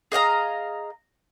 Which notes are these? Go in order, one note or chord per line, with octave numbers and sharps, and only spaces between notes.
G#4 D#5 F5 A#5